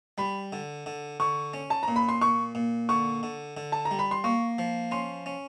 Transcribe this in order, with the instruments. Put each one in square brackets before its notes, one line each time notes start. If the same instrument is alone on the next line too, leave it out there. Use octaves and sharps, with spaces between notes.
[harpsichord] G3 [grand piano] B5
[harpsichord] D3
D3
[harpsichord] D3 [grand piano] C#6
[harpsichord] C#4
[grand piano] A5
A#5
[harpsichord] A#2
[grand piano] B5
C6
[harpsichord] A#2 [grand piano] C#6
[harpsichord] A#2
[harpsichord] D3 [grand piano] C#6
[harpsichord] D3
D3
[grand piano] A5
A#5
[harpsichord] G3
[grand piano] B5
C6
[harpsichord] A#3 [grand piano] C#6
[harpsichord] F3
[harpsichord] C#4 [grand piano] C6
[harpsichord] C#4